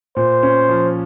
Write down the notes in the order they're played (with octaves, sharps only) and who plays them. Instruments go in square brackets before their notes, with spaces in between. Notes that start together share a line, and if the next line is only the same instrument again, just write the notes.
[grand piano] A#2 [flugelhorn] C5
[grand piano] C#4
F3